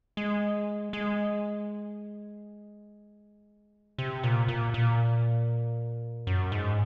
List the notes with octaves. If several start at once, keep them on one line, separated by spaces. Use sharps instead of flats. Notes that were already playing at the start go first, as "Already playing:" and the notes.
G#3
G#3
C3
A#2
A#2
A#2
F#2
G#2